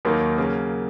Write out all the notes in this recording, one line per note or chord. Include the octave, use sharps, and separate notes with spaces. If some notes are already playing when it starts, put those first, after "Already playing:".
D#2 D#3 F#3 A#3 D#4
C#3 F#3 A#3